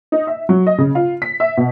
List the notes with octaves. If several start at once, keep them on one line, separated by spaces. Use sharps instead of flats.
D#4
E5
F#3
D#5
C#3
F4
B6
E5
B2